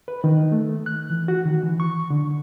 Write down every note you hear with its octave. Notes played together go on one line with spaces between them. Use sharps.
B4
D#3
A3
F#6
E3
F#4
D#3
E3
C#6
D3